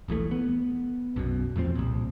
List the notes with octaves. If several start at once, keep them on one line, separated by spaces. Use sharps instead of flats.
D#1 A#1 E3 A3
B3
B1 F#2 B2
E2 A2 F3 C4
C2 A#2